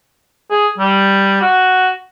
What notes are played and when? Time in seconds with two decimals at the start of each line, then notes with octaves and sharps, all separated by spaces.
0.50 G#4
0.78 G3
1.42 F#4